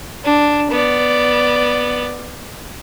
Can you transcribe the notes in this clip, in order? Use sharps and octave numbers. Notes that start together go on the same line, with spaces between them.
D4
B3 D5